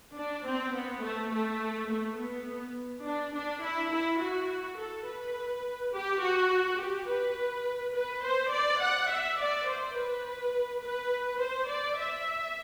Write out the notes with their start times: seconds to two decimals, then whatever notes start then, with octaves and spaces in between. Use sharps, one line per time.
0.16 D4
0.45 C4
0.74 B3
1.02 A3
1.31 A3
1.89 A3
2.18 B3
3.04 D4
3.33 D4
3.62 E4
3.91 E4
4.19 F#4
4.77 A4
5.06 B4
5.93 G4
6.21 F#4
6.79 G4
7.08 B4
7.94 B4
8.23 C5
8.52 D5
8.81 F#5
9.09 E5
9.39 D5
9.67 C5
9.96 B4
10.82 B4
11.40 C5
11.68 D5
11.98 E5